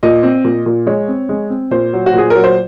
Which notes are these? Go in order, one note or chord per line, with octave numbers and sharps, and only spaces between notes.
A#2 D#5
C4
A#2
A#2
G#3 C#5
C4
G#3
C4
A#2 C5
F#3
F#4
A#2 G#4
A#4
F#3
C5